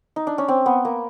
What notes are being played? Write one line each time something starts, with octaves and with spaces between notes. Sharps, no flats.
D#4
D4
C#4
C4
B3
A#3